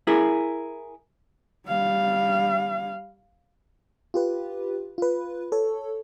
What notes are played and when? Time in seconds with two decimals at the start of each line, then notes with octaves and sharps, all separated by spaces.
0.07 E4 G#4 A#4
1.68 G3 F5
4.14 F4 G4 B4
4.98 F4 B4
5.52 A4 C#5